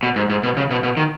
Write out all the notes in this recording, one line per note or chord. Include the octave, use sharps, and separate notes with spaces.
B2
G#2
G#2
B2
C#3
B2
B2
D#3